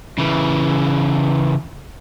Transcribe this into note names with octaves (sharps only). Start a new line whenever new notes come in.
C#3 E3